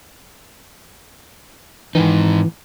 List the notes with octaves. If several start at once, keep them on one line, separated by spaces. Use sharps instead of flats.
G#2 D#3 E3 D#4